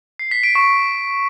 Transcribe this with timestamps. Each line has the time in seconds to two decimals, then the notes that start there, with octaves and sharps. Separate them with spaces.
0.19 C7
0.31 B6
0.43 D7
0.55 C#6